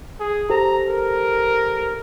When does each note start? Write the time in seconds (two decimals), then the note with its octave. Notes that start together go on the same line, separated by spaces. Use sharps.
0.20 G#4
0.50 G4 A4 C5 A#5
0.88 A#4